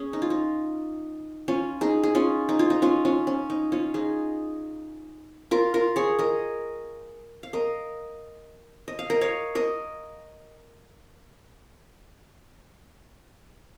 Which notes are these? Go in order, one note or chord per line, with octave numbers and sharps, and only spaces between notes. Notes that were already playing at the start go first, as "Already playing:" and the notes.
Already playing: C#4 G#4
D#4
F4
D#4
C#4 F4
D#4 G#4
G#4
C#4 F4
D#4
F4
D#4
C#4 F4
C#4 F4
C#4
D#4
C#4 F4
D#4 G#4
F4 A#4
F4 A#4
G#4 C#5
A#4 D#5
F5
A#4 D#5
D#5
F5
A#4 D#5
C#5 F5
A#4 D#5